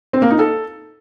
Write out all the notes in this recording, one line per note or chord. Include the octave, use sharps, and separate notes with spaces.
C4
A#3
D#4
A4